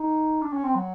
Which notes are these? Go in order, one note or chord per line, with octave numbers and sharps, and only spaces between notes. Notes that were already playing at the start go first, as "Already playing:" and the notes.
Already playing: D#4
D4
C#4
C4
F#3